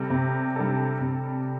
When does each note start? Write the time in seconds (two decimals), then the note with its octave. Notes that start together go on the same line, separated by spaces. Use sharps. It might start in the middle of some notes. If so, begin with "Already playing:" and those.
Already playing: C3 G3 A4
0.10 C3
0.56 G3 D4 A4
1.01 C3